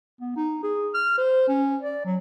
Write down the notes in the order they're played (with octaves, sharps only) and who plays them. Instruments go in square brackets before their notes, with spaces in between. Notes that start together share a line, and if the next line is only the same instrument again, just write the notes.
[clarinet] B3
D#4
G#4
F6
C5
C#4
D5
F#3